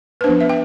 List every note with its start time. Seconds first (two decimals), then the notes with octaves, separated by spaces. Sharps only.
0.21 B4
0.24 F3 B3 D4 C5
0.40 E5
0.49 G5